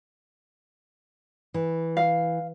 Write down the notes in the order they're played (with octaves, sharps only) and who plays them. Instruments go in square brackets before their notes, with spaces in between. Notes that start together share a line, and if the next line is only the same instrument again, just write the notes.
[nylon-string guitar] E3
[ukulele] F5